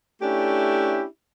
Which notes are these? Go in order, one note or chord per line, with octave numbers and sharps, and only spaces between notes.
A3 C#4 D4 E4 G4